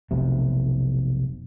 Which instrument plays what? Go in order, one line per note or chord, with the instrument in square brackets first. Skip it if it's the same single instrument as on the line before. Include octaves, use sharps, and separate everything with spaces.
[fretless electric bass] F1 B1 C3